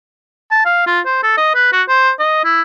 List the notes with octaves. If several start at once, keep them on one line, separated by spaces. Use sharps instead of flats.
A5
F5
F4
C5
A4
D#5
B4
F#4
C5
D#5
E4